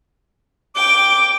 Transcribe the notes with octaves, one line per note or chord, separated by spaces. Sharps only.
G5 D6